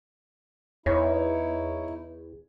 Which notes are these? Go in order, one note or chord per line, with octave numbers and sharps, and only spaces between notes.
E2 D#4 E4 C#5